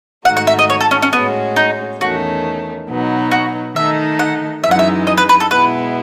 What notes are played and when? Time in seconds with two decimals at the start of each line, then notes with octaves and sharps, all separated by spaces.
0.25 G#2 D#3 A3 D#4 F#4 F#5
0.37 F#5
0.47 E5
0.59 D#5
0.70 C#5
0.81 A4
0.91 C#4
1.02 C#4
1.13 A2 G#3 B3 C#4 F#4
1.56 D#4
2.01 E2 D#3 A3 C#4 F#4
2.88 B2 F#3 B3 D#4
3.31 F#4
3.75 D#3 A3 D#4 E5
4.19 F#5
4.63 F#2 E3 G#3 D#4 E5
4.71 F#5
4.79 E5
5.07 D#5
5.17 B4
5.29 B4
5.40 A4
5.51 B2 G#3 B3 E4 B4